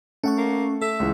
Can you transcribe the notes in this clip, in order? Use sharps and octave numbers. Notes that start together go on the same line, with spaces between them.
A3 C#4 F#5 C#6
A#3
A4 E5
C#2 E3